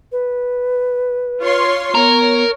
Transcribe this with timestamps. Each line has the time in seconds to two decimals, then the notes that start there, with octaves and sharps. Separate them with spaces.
0.12 B4
1.42 F4 C#5 C6
1.94 B3 A#4 C#5